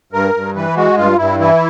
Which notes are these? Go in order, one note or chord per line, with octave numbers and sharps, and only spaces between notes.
G2 A#4
G2
E3 B4
G#3 F#4
G2 F4
G2 E4
E3 E4